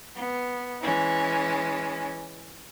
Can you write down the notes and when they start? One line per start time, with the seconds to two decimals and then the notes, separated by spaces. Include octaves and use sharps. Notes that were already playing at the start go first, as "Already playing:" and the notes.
0.15 B3
0.80 E3 G#3 C#4